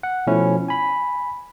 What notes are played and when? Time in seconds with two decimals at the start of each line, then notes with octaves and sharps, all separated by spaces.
0.03 F#5
0.27 B2 F3 A3 C#4 E4
0.68 G#5 B5